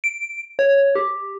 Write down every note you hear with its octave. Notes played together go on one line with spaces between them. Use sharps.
D7
C#5
G4